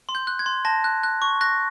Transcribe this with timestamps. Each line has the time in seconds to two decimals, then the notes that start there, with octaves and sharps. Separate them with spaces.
0.09 C6
0.15 G6
0.27 F#6
0.39 G#6
0.46 C6
0.65 A5 A#6
0.84 F#6
1.03 F#6
1.22 C#6
1.41 F#6 A#6